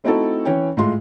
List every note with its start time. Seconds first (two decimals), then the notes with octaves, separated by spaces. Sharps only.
0.04 A3 C4 D#4 E4 F#4 A4
0.45 E3 C#4 C#5 G5
0.77 A2 G#3 F4 C6